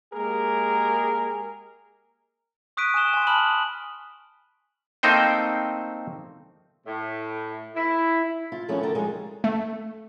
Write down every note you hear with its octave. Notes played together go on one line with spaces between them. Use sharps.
G#3 A#3 G4 G#4 A#4
C#6 D#6 F#6 B6 D7 D#7
G#5 D#6 F#6 E7 G7
G#5 C6
A5 B5 D#6 F6 F#6 F#7
A3 A#3 C4 D#4 C5 G5
A2
E4
E4 F4
D#3 F3 A3 B3 C#4 F#4
D3 A4 A#4 G5
F3 G3 G#3 D#4 G#4
A3